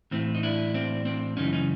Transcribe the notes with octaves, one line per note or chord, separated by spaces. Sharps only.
A2 E3 C4
D#4
D4 E4
C4 D4
C4 D4
F#2 C#3 E3 C#4 D#4
C#4 D#4